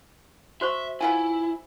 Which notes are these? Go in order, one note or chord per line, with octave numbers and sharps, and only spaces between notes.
F#4 C5 E5 C#6
B3 E4 F4 G#5